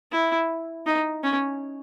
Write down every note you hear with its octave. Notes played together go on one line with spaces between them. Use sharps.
E4
D#4
C#4